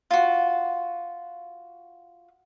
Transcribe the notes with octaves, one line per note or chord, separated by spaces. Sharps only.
F4 F#4